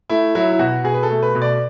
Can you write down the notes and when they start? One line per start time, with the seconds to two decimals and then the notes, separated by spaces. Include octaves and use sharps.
0.09 A3 E4
0.35 F#3 E4
0.52 E4
0.59 B2 F#4
0.84 B2 G#4
0.94 B4
1.03 A4
1.10 A3
1.22 B4
1.35 B2
1.42 D5